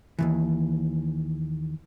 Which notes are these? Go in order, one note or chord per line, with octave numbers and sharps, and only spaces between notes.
D#2 G#2 E3